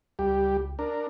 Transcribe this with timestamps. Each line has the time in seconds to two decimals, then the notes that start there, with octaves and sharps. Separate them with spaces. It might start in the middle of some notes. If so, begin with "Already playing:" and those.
0.19 C#2 G3 G4
0.79 D4 A#4